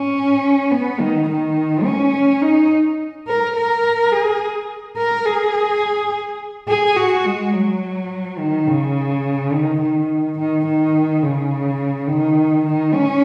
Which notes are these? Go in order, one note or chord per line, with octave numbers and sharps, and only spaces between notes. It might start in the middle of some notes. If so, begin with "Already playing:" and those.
Already playing: C#4
B3
D#3
D#3
C#4
D#4
A#4
A#4
G#4
A#4
G#4
G#4
F#4
G#3
F#3
D#3
C#3
D#3
D#3
D#3
D#3
C#3
D#3
D#3
C#4